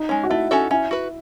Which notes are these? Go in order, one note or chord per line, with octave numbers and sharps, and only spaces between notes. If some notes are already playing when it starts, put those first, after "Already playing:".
Already playing: D#4
G#3 C#4
F#4
A3 E4
C#4 F#4 A4 E5
C#4 E4
F#4 B4